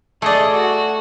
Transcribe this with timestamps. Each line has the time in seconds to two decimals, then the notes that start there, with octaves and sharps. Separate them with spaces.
0.22 A3 G#4 D5 D#5
0.51 F#4